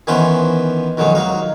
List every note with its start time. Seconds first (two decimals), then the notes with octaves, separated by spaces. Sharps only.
0.07 D#3 E3 B3 C#4 B4 C5
0.97 F2 D#3 F#3 G#3 D#4
1.15 F#3 D#4 F5